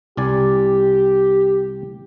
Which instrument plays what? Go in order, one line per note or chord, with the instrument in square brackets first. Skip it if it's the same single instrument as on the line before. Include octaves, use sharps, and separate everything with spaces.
[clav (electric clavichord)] C2 D5 G#5 [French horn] G4